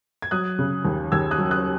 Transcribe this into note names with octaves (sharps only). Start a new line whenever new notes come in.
G#6
F#3 D#6 F#6
C#3
D#2
D#2 E6 G#6
D#6 F#6
F#3
D#6 F#6